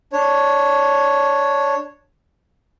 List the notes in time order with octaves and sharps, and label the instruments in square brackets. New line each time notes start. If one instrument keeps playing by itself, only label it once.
[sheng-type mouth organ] D4 C#5